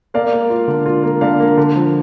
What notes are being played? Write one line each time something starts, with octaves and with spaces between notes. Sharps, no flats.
A#3 D5 F5
A#3
F4
D3
F4
A#3
D3 D5 F5
A#3
D3
F3